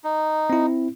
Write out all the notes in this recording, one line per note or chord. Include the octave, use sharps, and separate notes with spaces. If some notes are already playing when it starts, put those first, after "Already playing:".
D#4
C4 E4